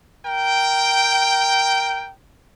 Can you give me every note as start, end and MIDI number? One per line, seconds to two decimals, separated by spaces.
0.25 2.10 70
0.25 2.10 79